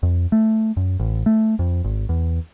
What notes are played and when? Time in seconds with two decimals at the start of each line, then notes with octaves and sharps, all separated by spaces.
0.03 F2
0.32 A3
0.77 F#2
1.00 A1
1.26 A3
1.59 F2
1.84 G#1
2.09 E2